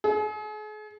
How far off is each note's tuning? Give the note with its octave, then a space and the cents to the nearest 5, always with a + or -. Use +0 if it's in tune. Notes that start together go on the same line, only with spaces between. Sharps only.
G#4 +40